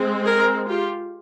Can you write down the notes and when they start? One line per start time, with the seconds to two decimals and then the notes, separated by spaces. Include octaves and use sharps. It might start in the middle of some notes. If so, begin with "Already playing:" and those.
Already playing: G#3 C4
0.25 G#4 A#4
0.68 F4 G4